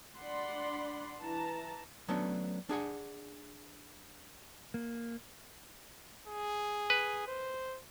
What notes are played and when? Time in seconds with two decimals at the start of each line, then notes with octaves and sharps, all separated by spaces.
0.17 D4 D5 F#5 B5 C6
1.20 E3 A5 A#5
2.08 F#3 A3 B3 C#4 D4
2.69 D4 G#4 F#5 G#5
4.74 A#3
6.27 G#4
6.90 B4
7.27 C5